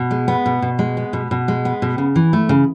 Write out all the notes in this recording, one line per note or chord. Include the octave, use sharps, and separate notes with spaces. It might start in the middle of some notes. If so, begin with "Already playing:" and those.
Already playing: B2
G#3
B3
B2
B2
G#3
B3
B2
B2
G#3
B3
B2
C#3
E3
A3
C#3